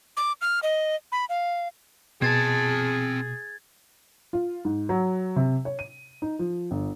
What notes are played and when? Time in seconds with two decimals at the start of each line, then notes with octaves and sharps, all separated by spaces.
0.17 D6
0.41 F6
0.63 D#5
1.12 B5
1.29 F5
2.22 B2 C4 G#4 A5 G#6 A6
4.33 F4
4.65 G#2
4.89 F#3
5.36 C3
5.65 C#5
5.79 D#7
6.22 D#4
6.39 F3
6.71 G1